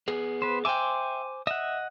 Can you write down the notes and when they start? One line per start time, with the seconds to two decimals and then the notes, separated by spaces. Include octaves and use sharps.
0.08 B3 G#4
0.42 B4 C5
0.65 C5 E5 G5 G#5 D6
1.47 D#5 E5 F#5